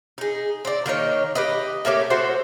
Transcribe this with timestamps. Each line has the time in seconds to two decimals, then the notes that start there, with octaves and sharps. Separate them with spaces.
0.18 D#4 G#4
0.65 C4 D5
0.86 D#3 A#3 D#4 C#5
1.35 G4 B4 D#5
1.85 A3 A#3 C#4 G4
2.10 F#4 A4 C5